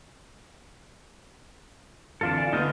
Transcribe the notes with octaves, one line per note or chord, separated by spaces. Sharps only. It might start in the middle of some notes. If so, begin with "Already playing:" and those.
F2 D3 E3 D4 F4 A4
D5 F5 G#5
D2 A3 B3 D#4 F4 D#5